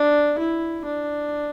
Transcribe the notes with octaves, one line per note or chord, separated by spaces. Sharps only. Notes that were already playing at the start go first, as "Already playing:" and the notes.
Already playing: D4
E4
D4